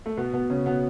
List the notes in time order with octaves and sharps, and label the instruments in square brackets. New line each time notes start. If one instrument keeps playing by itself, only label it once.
[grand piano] A3
B2 B3
B2 B3
C#3 C#4
B2 B3